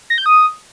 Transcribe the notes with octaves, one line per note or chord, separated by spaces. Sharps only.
A#6
G6
D#6